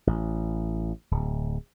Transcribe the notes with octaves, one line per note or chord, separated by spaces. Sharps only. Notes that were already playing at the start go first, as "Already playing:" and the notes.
A1
D1